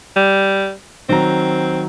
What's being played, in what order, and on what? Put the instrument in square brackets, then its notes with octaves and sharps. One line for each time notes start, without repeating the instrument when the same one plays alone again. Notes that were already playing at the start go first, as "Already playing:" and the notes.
[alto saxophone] G3
[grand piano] D#3 F#3 A#5 [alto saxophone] C4